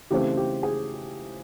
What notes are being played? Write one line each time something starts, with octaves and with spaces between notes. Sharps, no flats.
C#3 E3 A3 C4 G4
G4
G#4